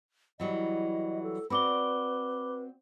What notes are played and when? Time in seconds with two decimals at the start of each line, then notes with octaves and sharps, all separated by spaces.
0.40 E3 F#3 G3 D#5
1.23 A4
1.50 C4 F#4 B4 D5 B5 D6 G7